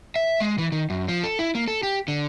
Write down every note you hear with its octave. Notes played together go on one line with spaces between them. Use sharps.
E5
G#3
E3
D#3
F#2
F3
A4
E4
A#3
A4
G4
D3